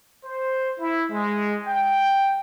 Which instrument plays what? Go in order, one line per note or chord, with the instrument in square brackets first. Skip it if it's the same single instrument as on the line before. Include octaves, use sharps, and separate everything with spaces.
[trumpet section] C5
E4
G#3
G5